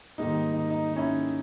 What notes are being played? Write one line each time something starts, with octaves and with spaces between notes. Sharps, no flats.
G#2 D#3 G3 A#3 D#4
D#4
D#4
D#4
C#4 E4